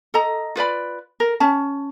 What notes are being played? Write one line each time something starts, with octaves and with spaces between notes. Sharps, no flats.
A4 D#5 A#5
F4 B4 D5 B5
A#4
C#4 A5